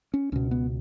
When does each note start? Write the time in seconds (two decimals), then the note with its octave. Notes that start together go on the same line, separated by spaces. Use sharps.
0.14 C#4
0.32 C#2 B2 C#4
0.51 B3